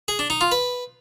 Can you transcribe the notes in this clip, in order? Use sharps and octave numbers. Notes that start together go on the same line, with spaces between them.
G#4
D4
D#4
F4
B4